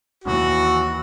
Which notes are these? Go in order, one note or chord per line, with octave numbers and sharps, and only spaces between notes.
D#2 E3 F#4